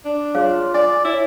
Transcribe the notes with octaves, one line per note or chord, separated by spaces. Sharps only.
D4
F4 G#4 C#5 F5
D5 G#5
E4 C#5